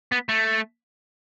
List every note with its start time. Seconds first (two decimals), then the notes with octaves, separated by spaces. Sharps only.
0.12 B3
0.29 A3